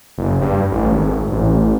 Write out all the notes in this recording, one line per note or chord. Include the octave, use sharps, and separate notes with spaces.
F#1
G2
A1
G#1
A1